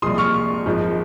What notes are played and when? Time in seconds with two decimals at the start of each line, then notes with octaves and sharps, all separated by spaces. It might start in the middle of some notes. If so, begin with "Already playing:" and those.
0.02 C2 A#2 F3 G#3 C6 D#6
0.18 C#6 F6
0.66 G#1 G#2 F3 G#3